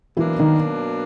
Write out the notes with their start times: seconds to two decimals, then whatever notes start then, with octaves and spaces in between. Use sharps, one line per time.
0.17 B2 E3 F#3 A#3 D4 E4
0.39 D#3 D#4